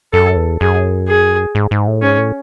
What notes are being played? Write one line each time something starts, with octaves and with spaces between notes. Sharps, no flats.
F#2 A4
E2
F#2 G#4
G#4
G#2
G#2
A2
G#2 C#4
A2